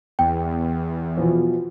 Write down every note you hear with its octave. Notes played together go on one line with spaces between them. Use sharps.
E2 G5
B2 E3 F3